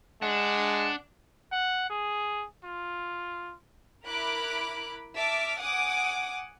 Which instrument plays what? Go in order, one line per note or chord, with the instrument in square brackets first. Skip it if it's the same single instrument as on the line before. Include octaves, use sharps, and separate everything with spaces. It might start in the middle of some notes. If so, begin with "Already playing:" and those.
[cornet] G#3 [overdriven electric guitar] D4 [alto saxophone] F#5
[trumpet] F#5
G#4
F4
[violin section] E4 A#4 B5 D6 F#6
E5 A5 D6 F6
F#5 G#5 D6 D#6